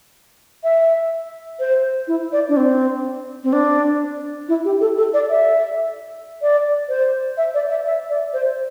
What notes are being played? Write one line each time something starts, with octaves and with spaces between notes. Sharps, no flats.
E5
C5
E4
D5
D4
C4
C4
D4
E4
G4
A4
A4
D5
E5
D5
C5
E5
D5
E5
E5
D5
C5